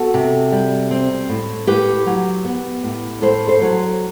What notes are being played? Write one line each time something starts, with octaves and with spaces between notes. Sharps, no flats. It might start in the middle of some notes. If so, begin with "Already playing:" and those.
Already playing: B3 F#4 A4
C3
G3
C4
A2
A2 G4 B4
F#3
B3
A2
A2 A4 C5
A4 C5
F#3